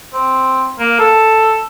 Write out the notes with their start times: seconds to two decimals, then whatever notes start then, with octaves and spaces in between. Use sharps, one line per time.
0.14 C4
0.79 A#3
0.99 A4